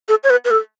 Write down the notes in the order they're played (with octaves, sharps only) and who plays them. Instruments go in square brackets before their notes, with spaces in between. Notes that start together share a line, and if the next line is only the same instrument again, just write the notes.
[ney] A4
C#5
B4
B4
A4